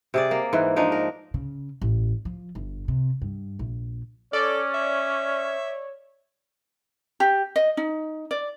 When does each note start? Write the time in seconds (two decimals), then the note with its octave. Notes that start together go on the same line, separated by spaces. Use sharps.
0.14 C3 G#4 D5
0.31 A#3
0.53 G#2 E3
0.76 F3 D4 D#4
0.92 A#4
1.34 C#3
1.82 A1
2.25 F3
2.55 G1
2.88 C3
3.22 G2
3.59 A#1
4.33 C#4 A4 C#5 D5
4.75 E5
7.20 G4
7.56 D#5
7.77 D#4
8.31 D5